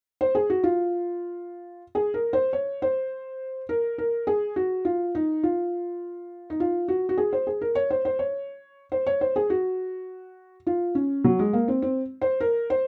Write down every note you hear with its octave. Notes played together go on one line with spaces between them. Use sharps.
C5
G#4
F#4
F4
G#4
A#4
C5
C#5
C5
A#4
A#4
G#4
F#4
F4
D#4
F4
D#4
F4
F#4
F#4
G#4
C5
G#4
A#4
C#5
C5
C5
C#5
C5
C#5
C5
G#4
F#4
F4
C#4
F#3
G#3
A#3
C4
C4
C5
A#4
C5